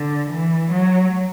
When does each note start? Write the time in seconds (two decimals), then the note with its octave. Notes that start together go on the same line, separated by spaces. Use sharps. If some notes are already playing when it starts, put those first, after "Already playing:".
Already playing: D3
0.30 E3
0.72 F#3